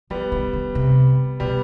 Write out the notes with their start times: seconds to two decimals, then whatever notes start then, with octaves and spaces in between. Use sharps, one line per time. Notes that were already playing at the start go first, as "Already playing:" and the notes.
0.10 F3 G3 B3
0.32 D#3
0.53 D3
0.75 C3
1.40 B2 G3 B3